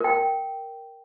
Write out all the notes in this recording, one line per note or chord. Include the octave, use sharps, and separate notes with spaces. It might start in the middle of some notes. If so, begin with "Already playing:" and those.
A#4 G5